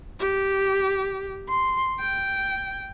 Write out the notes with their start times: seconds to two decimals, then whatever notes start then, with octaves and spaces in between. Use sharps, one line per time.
0.19 G4
1.48 C6
2.00 G5